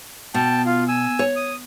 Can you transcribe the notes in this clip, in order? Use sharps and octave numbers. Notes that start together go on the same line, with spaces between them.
B2 G5 A5
F4 F5
G#5 E6
C#5
D#6